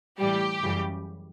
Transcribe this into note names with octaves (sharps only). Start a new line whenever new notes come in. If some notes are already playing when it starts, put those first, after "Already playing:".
A2 E3 G3 G4
F#2 C#3 E3 G3